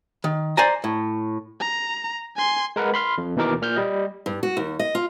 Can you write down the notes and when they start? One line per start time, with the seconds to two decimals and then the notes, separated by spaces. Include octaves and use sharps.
0.24 D#3
0.57 C5 D5 G#5 A#5
0.84 A2
1.60 A#5
2.36 G#5 C6
2.76 G#3 A#4 B4 F#5
2.94 B5 C6 F6
3.18 F2
3.36 D#2 B2 E3 D#4 A#4 D6
3.62 A#2 F6 G6
3.76 G3 D#5
4.26 G2
4.43 F#4
4.57 D#2
4.79 D#5
4.95 F4